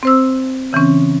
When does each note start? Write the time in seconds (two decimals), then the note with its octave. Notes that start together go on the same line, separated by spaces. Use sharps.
0.03 C4 C5 E6
0.73 C#3 E3 C4 C#4